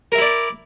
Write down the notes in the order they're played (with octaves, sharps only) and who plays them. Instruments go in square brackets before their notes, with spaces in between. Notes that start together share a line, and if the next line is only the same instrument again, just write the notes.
[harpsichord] A#4
E5
E4
D5